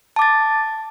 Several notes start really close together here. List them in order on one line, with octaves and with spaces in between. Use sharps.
A5 D6 A6